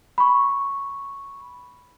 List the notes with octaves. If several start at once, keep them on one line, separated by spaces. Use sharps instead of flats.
B5 C#6